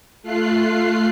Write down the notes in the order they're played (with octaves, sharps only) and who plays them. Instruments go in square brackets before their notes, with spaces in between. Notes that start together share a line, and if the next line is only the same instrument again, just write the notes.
[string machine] A3 F4 F#6 C7